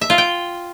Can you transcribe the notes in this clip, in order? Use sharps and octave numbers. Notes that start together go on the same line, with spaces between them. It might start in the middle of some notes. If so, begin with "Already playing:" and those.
E5
F4
G5